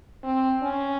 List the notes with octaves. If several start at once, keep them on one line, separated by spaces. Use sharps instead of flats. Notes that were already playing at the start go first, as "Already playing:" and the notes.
C4
C#4